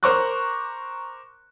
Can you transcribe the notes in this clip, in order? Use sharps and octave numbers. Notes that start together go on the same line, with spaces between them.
A#4 C5 A#5 C#6 D6 F#6